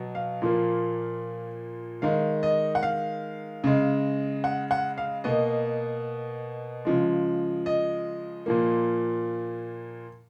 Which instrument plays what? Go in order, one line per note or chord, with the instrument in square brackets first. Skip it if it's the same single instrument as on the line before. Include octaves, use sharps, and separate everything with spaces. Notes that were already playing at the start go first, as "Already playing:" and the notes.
Already playing: [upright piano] B2 F#3
F5
A#2 F3 A#3
D#3 G#3 F5
D#5
F#5
F5
C#3 G#3
F#5
F#5
F5
B2 A#3 D#5
C#3 F3 G#3
D#5
A#2 F3 A#3